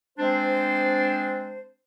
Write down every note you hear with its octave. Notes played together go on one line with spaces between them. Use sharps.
G#3 C4 D4 C5